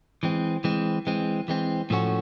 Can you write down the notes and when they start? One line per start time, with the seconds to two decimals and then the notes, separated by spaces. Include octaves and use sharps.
0.23 E3 G#3 C4
0.64 E3 G#3 C4
1.07 E3 G#3 C4
1.48 E3 G#3 C4
1.90 A2 F3 A3 C#4 F#4